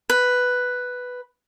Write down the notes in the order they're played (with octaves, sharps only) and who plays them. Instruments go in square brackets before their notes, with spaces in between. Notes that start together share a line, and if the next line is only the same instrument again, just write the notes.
[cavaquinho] B4